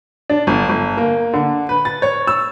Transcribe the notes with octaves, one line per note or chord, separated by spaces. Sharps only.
D4
G1
G1
A#3
D3
B4
A6
C#5
E6